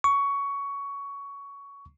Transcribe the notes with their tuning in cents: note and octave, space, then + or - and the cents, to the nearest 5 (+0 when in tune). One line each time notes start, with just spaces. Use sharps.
C#6 +15